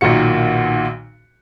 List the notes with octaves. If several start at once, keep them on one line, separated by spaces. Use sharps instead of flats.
B1 A#2 D#3 F#4 C#7